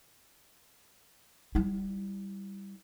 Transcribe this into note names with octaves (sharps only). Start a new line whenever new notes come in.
G3 E4